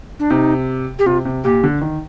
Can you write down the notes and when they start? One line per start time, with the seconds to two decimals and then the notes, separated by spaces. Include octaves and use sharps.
0.19 D4
0.30 C3 D#4
0.99 G4
1.06 C3 F4
1.25 C3
1.44 A#2 G4
1.64 D3
1.81 D#3